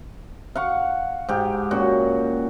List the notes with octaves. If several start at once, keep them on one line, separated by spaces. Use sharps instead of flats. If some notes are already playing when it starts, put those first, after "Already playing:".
F5 F#5 C#6
G#2 G4
A#2 C#4 F#4